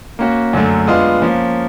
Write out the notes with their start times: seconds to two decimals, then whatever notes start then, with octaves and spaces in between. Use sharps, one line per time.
0.19 A#3 C#4 F#4
0.53 F#2 D3 F#3 A3
0.87 G#3 B3 D4 F4
1.22 F3 A#3 C#4